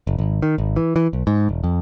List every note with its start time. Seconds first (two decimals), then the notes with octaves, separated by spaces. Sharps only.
0.07 F#1
0.18 G#1
0.42 D#3
0.58 G#1
0.76 E3
0.96 E3
1.13 B1
1.27 G#2
1.49 E1
1.64 F2